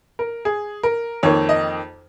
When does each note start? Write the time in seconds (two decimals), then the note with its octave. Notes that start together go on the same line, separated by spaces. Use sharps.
0.19 A#4
0.45 G#4
0.83 A#4
1.23 F2 D#3 A#3 C#5
1.49 D#5